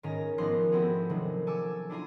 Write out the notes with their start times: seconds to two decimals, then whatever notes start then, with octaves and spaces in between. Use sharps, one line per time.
0.03 G#2 D#3 C#4 G#5 A#5 A#6
0.38 G#1 F3 B3 C6 F#6 A#6
0.72 A3 B3 C4 E4 F#4 G#4
1.09 C3 D#3 F#3 G#3 A3
1.47 G#5 A5 C#6 D6 E6
1.90 D4 E4 F4 G#5 A#5 C6